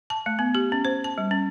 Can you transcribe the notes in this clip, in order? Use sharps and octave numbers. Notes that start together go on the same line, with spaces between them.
A5
A3
B3
G4
C#4
C5
A5
G3
C#4